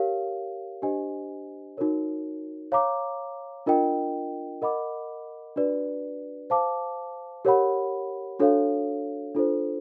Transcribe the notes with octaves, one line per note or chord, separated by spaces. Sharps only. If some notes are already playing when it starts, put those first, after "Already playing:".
Already playing: G4 A#4 C#5 F5
D4 G4 C5 D#5 G#5
D#4 F#4 A#4 C#5
C#5 F5 A#5 D6
D4 F4 A#4 D#5 G5
A#4 D#5 F#5 B5 D6
D4 F#4 B4 D5
C5 F5 A5 D6
G4 A#4 C#5 F#5 B5
D4 F#4 A4 C#5 F5
D4 F4 A4 C5